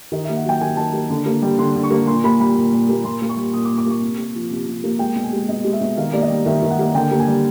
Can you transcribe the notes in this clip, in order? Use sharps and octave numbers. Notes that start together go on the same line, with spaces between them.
D#3 D#5
A#3 E5
F#5
F#3 G5
D#3 G#5
D#3 A5
A#3
D3
A#3
G3
D3 C6
D3
C#6
A#3
A#2 C6
A#3 B5
G3 B5
A#2
A#2
A#3
A#2 C6
A#3
C#6
G3
A#2 D#6
D6
A#2
D6
A#3 C#6
C3
A#3
F3
C3
C3
A#3
G#3 G5
B2
G#5
G#3
B2 D#5
G#3
E5
B2
D#3 F5
A#3 D5
D#5
G3
D#3 E5
D#3
F#5
A#3
D3 G5
A#3
G#5
G3